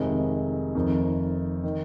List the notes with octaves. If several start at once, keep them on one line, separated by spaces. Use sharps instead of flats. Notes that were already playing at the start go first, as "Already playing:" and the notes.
Already playing: F1 F2 C3 D#3 G#3
F1 F2 D#3
D#3